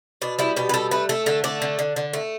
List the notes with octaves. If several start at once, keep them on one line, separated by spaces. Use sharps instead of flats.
B2 D4
G3 E4
B2 G4
B4
G3 A4
A3 B4
A3 A4
D3 A4
A3 D5
D3
D3
D3
A3